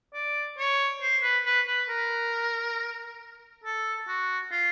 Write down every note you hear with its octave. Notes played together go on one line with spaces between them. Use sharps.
D5
C#5
C5
B4
B4
B4
A#4
A4
F#4
F4